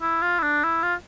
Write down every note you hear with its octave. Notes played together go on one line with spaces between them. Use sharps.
E4
F4
E4
D4
E4
F4